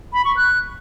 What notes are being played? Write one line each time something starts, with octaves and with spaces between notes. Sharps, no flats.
B5
C#6
F#6